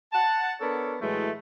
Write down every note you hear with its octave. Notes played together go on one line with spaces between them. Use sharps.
F#5 A5
B3 D4 A4 A#4 C#5
A2 E3 F#3 G#3 A3